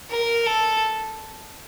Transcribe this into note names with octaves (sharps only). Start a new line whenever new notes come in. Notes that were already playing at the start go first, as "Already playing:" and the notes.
A#4
A4